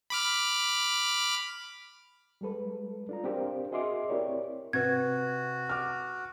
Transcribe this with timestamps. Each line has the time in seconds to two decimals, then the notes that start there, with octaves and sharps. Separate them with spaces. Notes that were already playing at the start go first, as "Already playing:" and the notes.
0.10 B5 D6 F6
2.41 G3 G#3 A4 B4
3.09 D4 F4 A#5
3.24 C4 D4 G4 A#4 C5 F5
3.71 F#4 G#4 D#5 E5 C6 D6
4.08 C4 E4 G4 A#4 C#5 D5
4.73 C3 F#4 B4 G#6
5.69 D6 F6